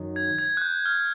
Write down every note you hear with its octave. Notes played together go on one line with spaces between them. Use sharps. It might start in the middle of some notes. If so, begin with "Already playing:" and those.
Already playing: F#2 D#3 F#3 D#4
G#6
G#6
F#6
G6
F6